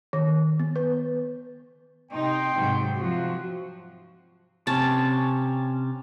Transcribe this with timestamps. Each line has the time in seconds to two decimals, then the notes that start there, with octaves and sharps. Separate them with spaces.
0.13 D#3
0.59 B3
0.76 B4
2.11 C3 D#4 G5 C6
2.54 G#2 C3 F#3
2.97 C3 F3 F#3 F#4
4.67 C3 C#4 A5